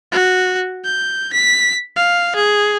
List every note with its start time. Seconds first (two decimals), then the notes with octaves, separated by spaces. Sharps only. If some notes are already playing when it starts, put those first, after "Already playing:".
0.12 F#4
0.85 G6
1.33 B6
1.96 F5
2.36 G#4